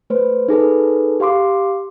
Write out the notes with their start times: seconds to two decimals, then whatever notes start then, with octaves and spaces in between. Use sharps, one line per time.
0.10 A3 B4 C5
0.48 D#4 G#4 A4 B4
1.20 G4 F5 C6 D6